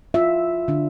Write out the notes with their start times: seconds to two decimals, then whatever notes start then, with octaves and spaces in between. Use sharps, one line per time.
0.14 F4 E5
0.68 D3 D4